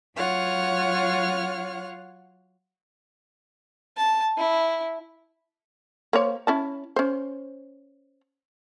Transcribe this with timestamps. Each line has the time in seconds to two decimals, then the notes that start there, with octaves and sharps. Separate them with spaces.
0.16 F#3 F4 C#5 F#5 F6
3.97 A5
4.37 E4
6.13 A#3 C5 C#5
6.47 C#4 E4 A5
6.96 C#4 C5